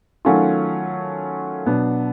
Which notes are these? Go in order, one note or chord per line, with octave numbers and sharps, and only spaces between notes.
D#3 F#3 A3 C#4 F4
B2 F#3 B3 D4